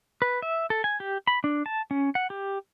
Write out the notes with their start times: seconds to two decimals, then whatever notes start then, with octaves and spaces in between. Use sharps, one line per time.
0.22 B4
0.42 E5
0.70 A4
0.84 G#5
1.00 G4
1.27 B5
1.44 D4
1.66 A5
1.91 C#4
2.15 F#5
2.30 G4